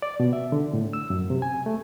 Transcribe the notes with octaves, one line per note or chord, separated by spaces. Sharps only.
D5
B2
E5
D3
A2
E6
F#2
C3
G#5
A3